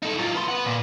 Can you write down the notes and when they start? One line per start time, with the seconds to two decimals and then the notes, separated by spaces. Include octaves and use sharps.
0.02 D#4 A4
0.18 F#3 F4
0.35 B3 C6
0.48 B4 F#5
0.65 A#2